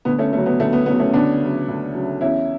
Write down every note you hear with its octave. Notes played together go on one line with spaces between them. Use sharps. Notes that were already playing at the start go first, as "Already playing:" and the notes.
D2 B3
A3 C#4
C#3 F#3 A3
B3
D2 A3
B3
C#3 F#3 B3
A3 C#4
D2 B3 D4
C#3 F#3
D2
C#3 F#3
E2 C#4 E4